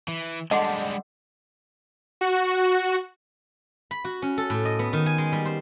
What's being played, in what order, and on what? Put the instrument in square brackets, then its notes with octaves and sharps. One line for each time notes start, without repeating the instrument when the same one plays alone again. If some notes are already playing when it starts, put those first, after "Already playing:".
[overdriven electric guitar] E3
[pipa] D3 [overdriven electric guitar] G3 G#3 [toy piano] D#5 F#5 C6
[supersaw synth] F#4
[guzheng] B5
F#4
C#4
A4
A2
D#5
B3
D#3
G#5
G#3
G3
C5